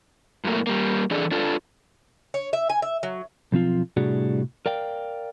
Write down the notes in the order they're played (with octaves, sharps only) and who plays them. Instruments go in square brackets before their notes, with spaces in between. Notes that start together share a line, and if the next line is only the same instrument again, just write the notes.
[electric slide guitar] F#2 A2 A3 A#3
G3 A#3
E3 D4 G#4 A4 D5
D4 F4 A4
[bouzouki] C#5
E5
G#5
E5
F#3
[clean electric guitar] B1 F3 C4 F4
A2 C3 G3 D4 F#4 G#4
A#4 D5 F5 G5